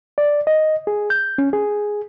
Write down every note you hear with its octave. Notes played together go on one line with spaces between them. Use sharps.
D5
D#5
G#4
G6
C#4
G#4